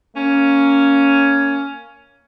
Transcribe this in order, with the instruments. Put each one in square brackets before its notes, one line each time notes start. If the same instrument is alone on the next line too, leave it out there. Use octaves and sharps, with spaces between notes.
[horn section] A#3 C#4